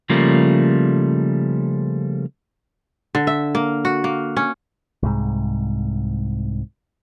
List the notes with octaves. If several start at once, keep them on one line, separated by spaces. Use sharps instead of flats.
C#3 F3 G3 A3 A#3
D3
E5
A#3
F#4
A#3
C#4
C2 G#2